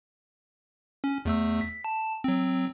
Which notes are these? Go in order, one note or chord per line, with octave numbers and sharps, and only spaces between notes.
C#4
E2 A3 E6
B6
A5
F#3 C4